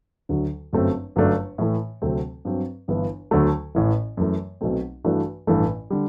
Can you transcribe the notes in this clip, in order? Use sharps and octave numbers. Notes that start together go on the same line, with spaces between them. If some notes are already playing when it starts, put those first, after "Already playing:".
D2 D3 F#3
G1 F#2 F#3 A3 C4
G1 F#2 F#3 A3 D4
A2 E3 A3
D2 C3 F#3 A3 C4
G2 F#3 C4
G1 G2 E3 B3 E4
D2 D3 F#3 A3
A1 A2 E3
F#2 E3 A3
B1 B2 F#3 A3 C4
G2 E3 A3 D4 F#4
A1 G2 E3 A3
D3 G3